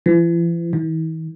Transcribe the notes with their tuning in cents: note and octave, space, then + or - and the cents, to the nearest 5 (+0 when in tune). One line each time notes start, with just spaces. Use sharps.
E3 +45
E3 -45